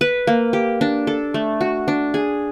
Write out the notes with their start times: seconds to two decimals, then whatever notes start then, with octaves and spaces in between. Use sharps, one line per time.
0.01 B4
0.27 A#3
0.53 G4
0.81 D4
1.07 A4
1.34 A3
1.61 F#4
1.88 D4
2.14 G#4